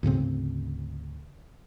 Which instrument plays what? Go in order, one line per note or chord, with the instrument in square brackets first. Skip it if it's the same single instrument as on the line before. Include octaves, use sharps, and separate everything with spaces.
[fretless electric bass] D2 G#2 C#3 C4